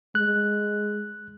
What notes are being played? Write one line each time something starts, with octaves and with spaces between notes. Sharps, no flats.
G#3 F#6